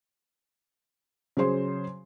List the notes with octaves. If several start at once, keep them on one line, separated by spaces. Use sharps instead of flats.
C#3 F#3 G#4 C5 C6